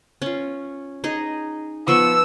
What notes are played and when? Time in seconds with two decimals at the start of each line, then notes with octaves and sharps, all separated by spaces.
0.22 C#4 F4
1.04 D#4 G#4 D#5
1.88 F3 B3 C#6 E6